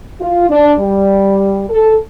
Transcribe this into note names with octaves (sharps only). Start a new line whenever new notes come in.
F4
D4
G3
A4